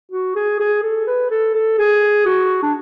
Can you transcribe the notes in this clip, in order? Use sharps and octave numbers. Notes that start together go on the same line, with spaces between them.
F#4
G#4
G#4
A4
B4
A4
A4
G#4
F#4
D4